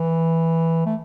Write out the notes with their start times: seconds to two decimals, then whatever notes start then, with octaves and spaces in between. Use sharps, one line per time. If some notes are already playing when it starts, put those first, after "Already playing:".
Already playing: E3
0.86 A3